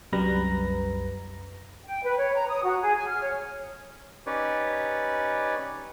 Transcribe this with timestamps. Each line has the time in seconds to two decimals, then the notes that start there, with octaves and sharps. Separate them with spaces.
0.12 C2 F#2 G3 B4 A#5 A#6
1.85 G5
2.03 B4
2.17 C#5
2.34 A#5
2.49 D#6
2.62 F#4
2.81 G#4
2.96 G#5
3.07 F6
3.21 C#5
4.26 C#4 D#4 G4 B4 C#5 D5